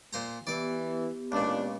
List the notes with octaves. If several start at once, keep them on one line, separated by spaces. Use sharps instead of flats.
A#2 C5 A#5
E3 B3 G4 D5 D6
C#2 A#2 E3 G#3 D4